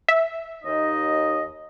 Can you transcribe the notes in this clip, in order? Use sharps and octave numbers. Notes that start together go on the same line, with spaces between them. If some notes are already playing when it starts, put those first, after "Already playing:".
E5
D#2 D#4 D#5